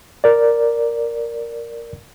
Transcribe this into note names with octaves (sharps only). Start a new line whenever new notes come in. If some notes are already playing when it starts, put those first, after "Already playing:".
A#4 D5